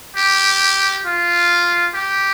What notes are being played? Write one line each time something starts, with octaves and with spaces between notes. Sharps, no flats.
G4
F4
G4